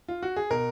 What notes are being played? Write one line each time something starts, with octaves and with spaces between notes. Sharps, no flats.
F4
F#4
G#4
B2 A#4